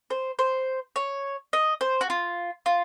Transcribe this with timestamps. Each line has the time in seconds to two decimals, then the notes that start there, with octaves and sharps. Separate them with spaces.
0.10 C5
0.39 C5
0.96 C#5
1.53 D#5
1.81 C5
2.01 F#4
2.10 F4
2.66 F4